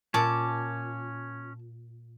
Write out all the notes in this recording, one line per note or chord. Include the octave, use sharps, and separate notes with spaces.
A#2 C#4 A5 D6